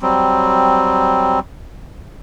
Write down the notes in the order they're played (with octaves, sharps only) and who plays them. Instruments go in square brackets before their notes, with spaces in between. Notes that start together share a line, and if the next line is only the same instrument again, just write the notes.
[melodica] F#3 G3 C4